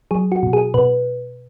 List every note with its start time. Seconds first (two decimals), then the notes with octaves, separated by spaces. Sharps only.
0.11 F#3 G#4
0.32 F#4
0.43 B2
0.53 G#4
0.74 B2 B4